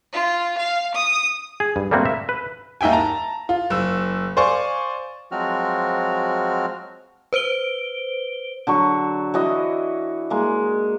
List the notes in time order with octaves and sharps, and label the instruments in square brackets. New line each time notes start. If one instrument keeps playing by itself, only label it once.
[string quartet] F4
F5
D#6
[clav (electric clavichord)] G#4
G2
G3 A3 A#3 C4 F#4
E5
B4
[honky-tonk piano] D#2 D#4 E5 G5 G#5
A5 A#5
F4
F#1 E6
C5 D5 F5 G#5 C#6
[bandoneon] F3 F#3 G#3 C4 F#4 F6
[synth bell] B4 C5 D7 G7
[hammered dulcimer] D3 F#3 C#6
E3 F#4 D#5
G#3 A#3